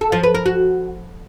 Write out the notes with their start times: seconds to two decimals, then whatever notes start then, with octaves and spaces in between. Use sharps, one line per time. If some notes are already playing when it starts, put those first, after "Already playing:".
0.01 A4
0.12 F3
0.23 B4
0.34 A#4
0.46 F#4